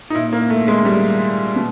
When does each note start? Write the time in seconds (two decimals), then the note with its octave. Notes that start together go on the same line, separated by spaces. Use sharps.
0.10 D#4
0.15 A#2 E4
0.33 A#3
0.50 A3
0.68 G#3
0.85 G3
1.56 B2